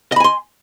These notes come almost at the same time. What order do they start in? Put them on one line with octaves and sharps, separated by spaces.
D#5 B5 G#5 C6